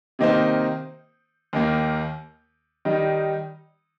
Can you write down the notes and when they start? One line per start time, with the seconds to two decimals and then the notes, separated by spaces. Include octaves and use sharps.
0.19 C3 D#3 A#3 D#4 C5
1.53 D#2 D#3 A#3
2.85 D#3 G3 D#4